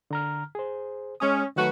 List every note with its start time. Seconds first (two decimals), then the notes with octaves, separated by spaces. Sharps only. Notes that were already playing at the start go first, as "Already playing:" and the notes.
0.11 D3 A#5 F6
0.55 G#4 C5
1.20 G#3 C#4 D#6
1.56 D#3 F#3 A3 F#4 B4